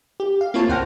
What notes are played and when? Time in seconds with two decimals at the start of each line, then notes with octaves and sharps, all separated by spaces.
0.20 G4
0.41 F5
0.54 A#3 C4 E4 F4 C#5 A5
0.69 D2 C5 F#5 G5 F6 A#6